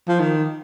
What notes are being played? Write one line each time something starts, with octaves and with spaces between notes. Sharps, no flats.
F3
D#3